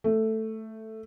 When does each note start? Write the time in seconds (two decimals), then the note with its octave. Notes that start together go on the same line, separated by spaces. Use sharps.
0.04 A3